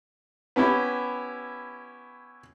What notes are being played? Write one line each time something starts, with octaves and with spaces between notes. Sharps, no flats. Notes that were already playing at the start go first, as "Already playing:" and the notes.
B3 C#4 E4 G4